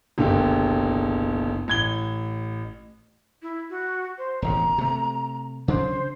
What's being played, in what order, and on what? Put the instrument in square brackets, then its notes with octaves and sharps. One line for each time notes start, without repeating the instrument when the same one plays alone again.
[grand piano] F#1 B1 D3 G4
A1 G#6 G7
[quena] E4
F#4
C5
[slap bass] E1 A1 C#3 [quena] A#5
[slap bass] C3 A3
[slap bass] C#3 F#3 D4 [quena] C5